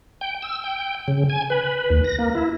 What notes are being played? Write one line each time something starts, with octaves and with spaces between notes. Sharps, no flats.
G5
E6
G5
C#3
G#5
B4
D#2
A#6
A#3
E4